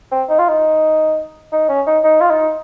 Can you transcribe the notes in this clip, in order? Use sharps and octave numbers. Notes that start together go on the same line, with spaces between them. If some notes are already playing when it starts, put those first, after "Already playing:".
C4
D#4
F4
D#4
D#4
C#4
D#4
D#4
F4
D#4